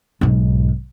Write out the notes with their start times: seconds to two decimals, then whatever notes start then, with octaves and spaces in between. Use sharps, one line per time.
0.21 B1 G#2